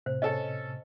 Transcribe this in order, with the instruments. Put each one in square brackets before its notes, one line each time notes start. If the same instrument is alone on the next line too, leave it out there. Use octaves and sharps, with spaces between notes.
[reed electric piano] A2 C3 [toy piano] C5
[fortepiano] C#4 A4 [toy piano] D#5